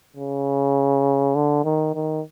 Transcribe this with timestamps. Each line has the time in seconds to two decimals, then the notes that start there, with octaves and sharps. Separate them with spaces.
0.16 C#3
1.35 D3
1.65 D#3
1.95 D#3